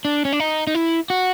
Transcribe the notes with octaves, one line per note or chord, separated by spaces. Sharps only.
D4
C#4
D4
D#4
D#4
E4
F#4